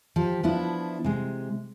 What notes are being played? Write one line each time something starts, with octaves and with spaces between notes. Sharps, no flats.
F3 G4
F3 B3 D4 E4
C3 G#3